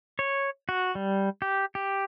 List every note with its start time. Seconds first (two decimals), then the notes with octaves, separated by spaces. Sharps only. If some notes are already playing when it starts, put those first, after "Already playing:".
0.19 C#5
0.69 F#4
0.95 G3
1.42 G4
1.75 G4